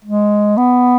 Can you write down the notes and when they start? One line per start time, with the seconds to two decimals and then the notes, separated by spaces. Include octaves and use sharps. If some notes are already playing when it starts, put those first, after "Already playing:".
0.04 G#3
0.57 B3